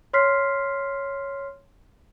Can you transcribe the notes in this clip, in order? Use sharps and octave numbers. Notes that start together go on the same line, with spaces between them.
C#5 C6 F6 B6 C7